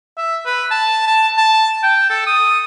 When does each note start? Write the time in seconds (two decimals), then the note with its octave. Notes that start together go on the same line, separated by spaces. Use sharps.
0.17 E5
0.45 B4
0.71 A5
1.07 A5
1.37 A5
1.83 G5
2.10 A4
2.27 D#6